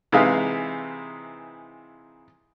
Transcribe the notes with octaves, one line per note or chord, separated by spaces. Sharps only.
C3 E3 G#3 D#4 B4 F5